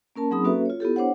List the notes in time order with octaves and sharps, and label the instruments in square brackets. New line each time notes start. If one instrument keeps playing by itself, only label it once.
[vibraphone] A#3 C#4 A#4 A5
F#3 C4 D#4 G#4 B5 D#6
A#3 C#4 F#4 A4 B4 E5
F4 C#5
B3 E4 G4 A4
D4 C5 C#5 F#5